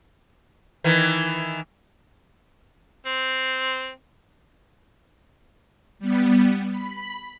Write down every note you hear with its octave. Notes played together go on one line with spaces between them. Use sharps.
D#3 E3
C4
G3 B3
B5